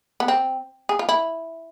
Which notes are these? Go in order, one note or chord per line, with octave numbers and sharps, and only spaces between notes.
B3
C4
G#4
F4
E4